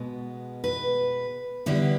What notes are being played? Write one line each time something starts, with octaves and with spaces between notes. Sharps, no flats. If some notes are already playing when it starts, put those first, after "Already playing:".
Already playing: B2 G#3 B3
B4
D3 G3 B3 E4